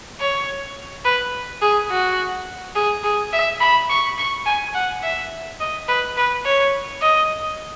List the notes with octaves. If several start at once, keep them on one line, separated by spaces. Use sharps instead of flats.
C#5
B4
G#4
F#4
G#4
G#4
E5
B5
C#6
C#6
G#5
F#5
E5
D#5
B4
B4
C#5
D#5